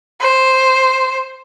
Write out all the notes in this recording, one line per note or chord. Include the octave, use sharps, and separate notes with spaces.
C5